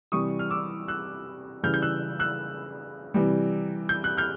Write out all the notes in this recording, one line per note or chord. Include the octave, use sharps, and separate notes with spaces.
C3 E3 G3 C#6 D#6
F6
D6 E6
E6 F#6
C#3 E3 G3 F6 G6
G6
E6 F#6
E6 F#6
C3 E3 G3
G6
F#6
F6 G6